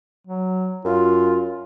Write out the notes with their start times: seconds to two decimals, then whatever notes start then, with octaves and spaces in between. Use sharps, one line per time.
0.27 F#3
0.85 F#2 F4